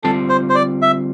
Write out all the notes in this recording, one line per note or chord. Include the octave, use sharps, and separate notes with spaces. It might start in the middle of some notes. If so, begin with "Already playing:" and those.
D3 G3 C4 F4 A4
C5
C5
D5
E5